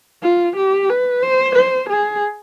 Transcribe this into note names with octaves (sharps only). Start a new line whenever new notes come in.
F4
G4
B4
C5
C5
G#4